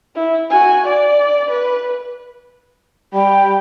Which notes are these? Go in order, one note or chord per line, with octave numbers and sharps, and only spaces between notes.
E4
F#4 G#5
D5
B4
G3 G5 B5